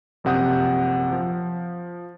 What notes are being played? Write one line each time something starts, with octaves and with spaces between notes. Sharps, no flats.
A#1 F#2 C3 F#5 D#6 G6
F3